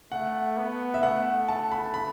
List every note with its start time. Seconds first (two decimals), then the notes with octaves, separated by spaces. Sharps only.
0.12 A3 F#5
0.58 B3
0.94 E5
1.03 A3 F#5
1.48 A5
1.72 B5
1.94 B5